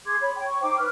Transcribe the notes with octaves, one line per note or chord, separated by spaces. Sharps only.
G#4 C6 D6 G#6
C#5 B5
G5
C#6
D#4 C5 G5 D6
B4 F6